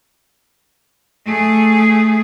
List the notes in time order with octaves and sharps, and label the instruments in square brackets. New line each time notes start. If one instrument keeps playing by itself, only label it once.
[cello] A3 G#4